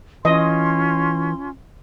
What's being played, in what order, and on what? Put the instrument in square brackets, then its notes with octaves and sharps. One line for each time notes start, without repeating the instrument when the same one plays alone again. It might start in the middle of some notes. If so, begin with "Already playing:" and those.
[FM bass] E3 [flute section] C#4 F4 C6 [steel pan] D#5